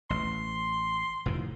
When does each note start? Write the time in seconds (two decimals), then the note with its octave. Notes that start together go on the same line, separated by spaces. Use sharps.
0.10 A1 C6
1.26 F1 A2 D#3